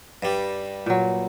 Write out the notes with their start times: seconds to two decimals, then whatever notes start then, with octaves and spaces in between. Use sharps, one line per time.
0.23 G2 G3
0.86 A#2 F#3